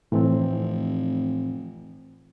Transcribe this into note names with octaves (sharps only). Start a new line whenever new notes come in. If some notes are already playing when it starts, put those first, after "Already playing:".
F1 A2 E3 C4